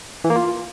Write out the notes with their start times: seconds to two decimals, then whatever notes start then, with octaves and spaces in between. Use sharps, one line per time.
0.24 E3
0.30 A#3
0.36 F4